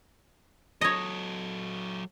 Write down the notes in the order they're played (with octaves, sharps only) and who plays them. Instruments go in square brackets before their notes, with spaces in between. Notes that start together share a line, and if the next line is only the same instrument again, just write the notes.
[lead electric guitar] F#3 A4 [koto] C#5 D#5